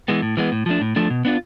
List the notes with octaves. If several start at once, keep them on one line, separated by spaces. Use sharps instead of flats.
E3 G#3 B3
A2
E3 G#3 B3
A2
F3 A3 D4
A2
F3 A3 D4
B2
B3 D4 F4